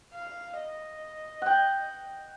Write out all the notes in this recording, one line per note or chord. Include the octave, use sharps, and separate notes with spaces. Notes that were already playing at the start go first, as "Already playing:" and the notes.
F5
D#5
F#5 G5